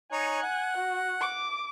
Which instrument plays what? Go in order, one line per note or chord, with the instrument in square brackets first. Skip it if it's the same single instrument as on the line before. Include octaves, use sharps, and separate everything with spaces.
[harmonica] D#4 C#5 [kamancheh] G#5 F#6
[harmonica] F#5
[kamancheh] F#4
D6